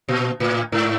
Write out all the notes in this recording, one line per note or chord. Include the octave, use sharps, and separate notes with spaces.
A#2
A2
G#2